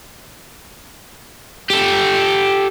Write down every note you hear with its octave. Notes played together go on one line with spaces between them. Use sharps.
G4 A4